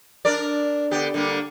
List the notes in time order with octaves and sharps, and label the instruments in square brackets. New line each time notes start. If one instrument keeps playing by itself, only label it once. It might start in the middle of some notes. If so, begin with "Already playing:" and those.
[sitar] D4 A#4 D5
D3 B3 G4
D3 G3 A#3